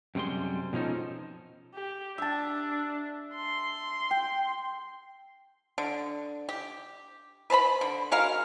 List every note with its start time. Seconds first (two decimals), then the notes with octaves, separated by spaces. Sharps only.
0.15 F#2 C3 G3 G#3 C6
0.73 B2 F3 C#4 D#4 A4
1.74 G4
2.18 D4 E5 A5
3.35 C6
4.11 G5
5.78 D3
6.49 G4
7.50 B4 C5 A5 B5
7.81 D3
8.11 G#3 F#4 A#4 F5